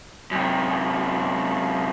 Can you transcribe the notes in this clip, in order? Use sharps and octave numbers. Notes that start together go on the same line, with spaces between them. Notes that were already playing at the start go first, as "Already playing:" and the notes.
F#2 C3